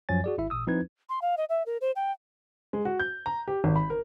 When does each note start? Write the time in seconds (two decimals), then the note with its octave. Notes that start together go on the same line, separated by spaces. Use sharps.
0.09 F#2 F3 F#3 C#5 G#5 A6
0.24 F#4 G#4 D5
0.38 G#1 E4 E5
0.50 A1 A#2 D#6 E6
0.67 F3 C4 D#4 E4 B4 G#6
1.09 C6
1.22 F5
1.37 D#5
1.49 E5
1.66 A#4
1.81 C5
1.96 G5
2.73 G#3
2.85 F#4
2.99 G6
3.26 A#5
3.48 G4
3.64 G#1
3.76 B5
3.90 A#4